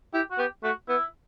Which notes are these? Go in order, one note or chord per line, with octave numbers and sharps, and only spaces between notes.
E4 G4
F#4
B3 G4
A3 F#4
B3 E4